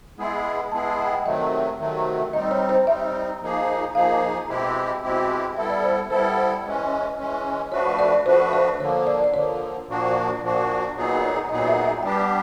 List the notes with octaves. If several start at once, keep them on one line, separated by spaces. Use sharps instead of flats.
G#3 B3 E4 G#4
G#3 B3 E4 G#4 A5
A5
F#5
G5
C3 D#3 F#3 A3 D#5
C3 D#3 F#3 A3
G3 C4 D#4 D#5
C#5
C5
G3 C4 D#4 E5
F3 A#3 D#4 G#4
F3 A#3 D#4 G#4 F5
B2 G#3 C4 E4 G4
B2 G#3 C4 E4 G4
G3 B3 E4 A4 E5
D5
C5
G3 B3 E4 A4 C5
C5
E3 G#3 C#4
E3 G#3 C#4
F3 A3 D4 F#4 B4 C#5
D5
F3 A3 D4 F#4 B4 C5
C5
D3 F3 A#3 C#5
D5
D5
D3 F3 A#3 C#5
A#2 F3 A#3 D4 F#4
A#2 F3 A#3 D4 F#4 D5
A#2 F#3 B3 D#4 G#4
A#2 F#3 B3 D#4 G#4 D#5
E5
E5
G3 B3 D4 G4 G5